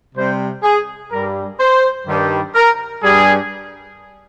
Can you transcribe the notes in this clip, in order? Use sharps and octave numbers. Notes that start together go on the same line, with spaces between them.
C3 G3 C5
G#4
G2 G3 A#4
C5
G2 D#3 G3
A#4
G2 G3 G#4